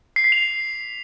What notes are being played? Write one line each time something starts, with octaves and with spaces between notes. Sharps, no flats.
C7
B6
F7